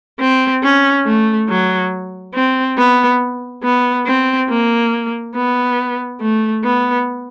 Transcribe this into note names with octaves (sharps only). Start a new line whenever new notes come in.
C4
C#4
A3
F#3
C4
B3
B3
C4
A#3
B3
A3
B3